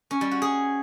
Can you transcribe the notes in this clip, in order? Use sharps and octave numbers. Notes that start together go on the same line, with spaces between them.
C#4
G3
F#4
G#4